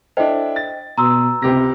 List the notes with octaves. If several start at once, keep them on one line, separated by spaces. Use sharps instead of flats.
D4 E4 A4 C5 D#5 G5
A6
B2 A#5 C6 D#6 E6
C#2 C3 G4 A#6